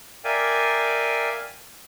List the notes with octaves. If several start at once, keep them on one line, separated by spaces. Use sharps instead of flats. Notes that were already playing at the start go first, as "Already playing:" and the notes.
A#4 D5 E5 F5 G5 G#5